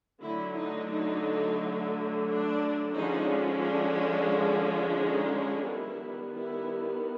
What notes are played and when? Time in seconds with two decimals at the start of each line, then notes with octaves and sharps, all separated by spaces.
0.22 D3 F#3 A3 D4 E4
0.57 D#4
0.91 D#4
2.27 D4
2.95 D3 F3 G#3 C#4 D#4
3.63 D4
4.99 D#4
5.67 D#3 G3 B3 E4
6.35 E4